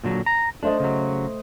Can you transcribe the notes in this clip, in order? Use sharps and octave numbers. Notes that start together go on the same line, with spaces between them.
A#2 D3 F#3
A#5
A3 D4 C5 D#5
C#3 F#3